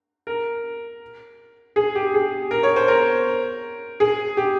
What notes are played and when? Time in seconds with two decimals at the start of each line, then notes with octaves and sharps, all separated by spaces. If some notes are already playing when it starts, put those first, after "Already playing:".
0.27 A#4
1.76 G#4
1.95 G4
2.14 G#4
2.51 A#4
2.63 C#5
2.76 C5
2.88 A#4
4.00 G#4
4.37 G4